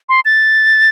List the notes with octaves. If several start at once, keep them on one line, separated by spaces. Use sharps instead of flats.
C6
A6